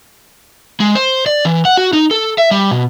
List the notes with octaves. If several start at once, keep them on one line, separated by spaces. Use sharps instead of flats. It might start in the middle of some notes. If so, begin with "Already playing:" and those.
G#3
C5
D5
E3
F#5
F#4
D#4
A4
E5
G3
B2